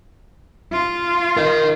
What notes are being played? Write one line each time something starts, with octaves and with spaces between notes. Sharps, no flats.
F4
A#4 D#5